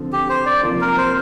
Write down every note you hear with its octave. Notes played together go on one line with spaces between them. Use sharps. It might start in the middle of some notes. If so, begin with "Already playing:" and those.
Already playing: D3 F3 C4
G4
C5
D5
C3 F3 A#3 F4
A#4
C5